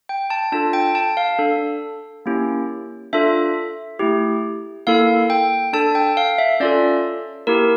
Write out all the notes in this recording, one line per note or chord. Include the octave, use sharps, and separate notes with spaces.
G5
A5
D4 F4 A4 A5
G5
A5
F5
D4 A4
A#3 C#4 E4 G4
D4 F4 A4 E5
A3 E4 G4
A#3 E4 A4 F5
G5
D4 A4 A5
G5
F5
E5
C#4 F4 A4 D5
A#3 E4 G4 A#4